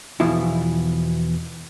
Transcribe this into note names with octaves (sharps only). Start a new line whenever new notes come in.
E2 B2 E3 F3 E4